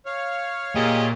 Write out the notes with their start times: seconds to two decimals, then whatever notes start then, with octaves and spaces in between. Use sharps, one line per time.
0.06 C#5 F5
0.76 A#2 G4 G#4 D#5